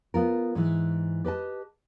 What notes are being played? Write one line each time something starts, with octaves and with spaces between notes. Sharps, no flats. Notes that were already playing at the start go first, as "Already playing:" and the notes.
B3 F4 A#4
G#2 E3
G4 B4 D#5 A5